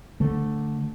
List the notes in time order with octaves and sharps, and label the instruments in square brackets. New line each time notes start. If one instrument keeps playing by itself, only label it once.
[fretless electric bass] D3 A3